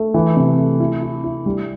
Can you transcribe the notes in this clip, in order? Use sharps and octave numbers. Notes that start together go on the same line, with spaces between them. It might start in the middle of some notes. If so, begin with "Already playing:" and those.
Already playing: A3
E3
C3
A3
E4
E4
E4
G3